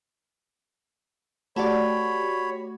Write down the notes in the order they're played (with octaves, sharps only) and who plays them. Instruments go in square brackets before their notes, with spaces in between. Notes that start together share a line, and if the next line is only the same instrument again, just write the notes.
[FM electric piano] A3 F#4 G4 [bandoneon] C#5 B5 [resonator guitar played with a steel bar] D5 A5